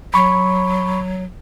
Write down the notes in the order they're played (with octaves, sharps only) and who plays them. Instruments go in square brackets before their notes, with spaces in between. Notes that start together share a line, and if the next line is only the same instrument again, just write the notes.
[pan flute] F#3 [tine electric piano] B5 C#6